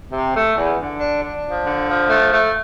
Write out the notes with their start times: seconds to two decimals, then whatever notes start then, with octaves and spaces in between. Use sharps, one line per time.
0.12 C3
0.34 A3
0.56 E2
0.78 D3
1.00 D4
1.22 D4
1.44 F3
1.66 D3
1.88 F3
2.09 A3
2.31 A3